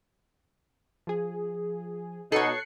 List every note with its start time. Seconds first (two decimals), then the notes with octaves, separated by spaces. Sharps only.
1.07 F3 G#4
2.32 B2 D#4 A4 C#5 F#6 C7 C#7